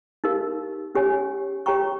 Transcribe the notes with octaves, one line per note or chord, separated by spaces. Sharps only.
D#4 G4 A#4 F5
C#4 G4 C#5 G#5
G4 C#5 G5 A#5 C#6